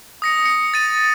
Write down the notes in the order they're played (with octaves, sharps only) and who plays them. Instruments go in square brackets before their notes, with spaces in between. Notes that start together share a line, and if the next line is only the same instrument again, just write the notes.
[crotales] D#6 A#6 C#7
C#7
A6 D#7